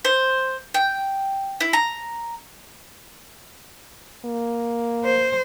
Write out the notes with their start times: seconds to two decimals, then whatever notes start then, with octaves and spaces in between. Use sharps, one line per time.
0.05 C5
0.74 G5
1.60 E4
1.73 A#5
4.25 A#3
5.04 C5